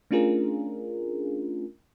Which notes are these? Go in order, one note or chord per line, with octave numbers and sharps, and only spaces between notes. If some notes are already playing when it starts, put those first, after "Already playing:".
A3 C#4 D4 F4 G#4 A#4